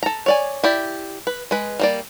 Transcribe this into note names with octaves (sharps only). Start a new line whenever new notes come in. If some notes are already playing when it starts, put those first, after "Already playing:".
A4 A#5
C#5 D5 G#5
E4 G4 D5
B4
G#3 B4
G3 A#3 D5